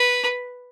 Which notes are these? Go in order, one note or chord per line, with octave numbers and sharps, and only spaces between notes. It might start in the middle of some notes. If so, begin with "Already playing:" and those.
Already playing: B4